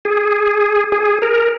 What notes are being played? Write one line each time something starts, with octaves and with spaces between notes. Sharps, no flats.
G#4
G#4
A#4